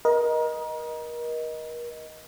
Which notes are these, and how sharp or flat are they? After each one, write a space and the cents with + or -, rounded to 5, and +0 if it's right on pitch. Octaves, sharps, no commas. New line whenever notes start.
A#4 +35 D#5 +0